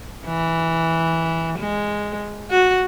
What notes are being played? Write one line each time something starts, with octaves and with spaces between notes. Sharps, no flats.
E3
G#3
F#4